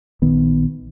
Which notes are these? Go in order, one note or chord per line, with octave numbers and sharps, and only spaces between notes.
A#1 D#3 B3